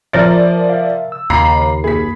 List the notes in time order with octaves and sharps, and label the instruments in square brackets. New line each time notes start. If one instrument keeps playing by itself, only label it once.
[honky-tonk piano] F3 D5 A6 [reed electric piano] F4 C5 E5 [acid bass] A#4
[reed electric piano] E5 F5
E6
[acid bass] D#2 [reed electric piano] C#3 F5 D6 [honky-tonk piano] A#5 B5 C7
[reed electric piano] F#2 A#3 B5 [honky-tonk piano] G#4 B6